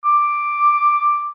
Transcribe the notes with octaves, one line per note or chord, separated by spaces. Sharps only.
D6